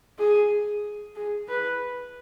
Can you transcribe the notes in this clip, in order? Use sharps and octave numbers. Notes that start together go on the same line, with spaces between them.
G#4
G#4
B4